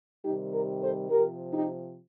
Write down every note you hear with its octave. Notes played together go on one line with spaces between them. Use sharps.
C3 D#3 G3 D#4 G4
G4 A#4
A4 C5
C3 F3 G4 A#4
D#4 G4